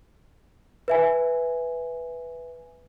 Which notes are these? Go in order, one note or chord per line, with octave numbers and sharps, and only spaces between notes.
B4 E5 G#5